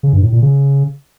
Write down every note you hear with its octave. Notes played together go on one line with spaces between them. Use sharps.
C#3
G2
A2
A#2
C#3